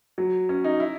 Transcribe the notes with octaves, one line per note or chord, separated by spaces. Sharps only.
F#3
C#4
D#4
E4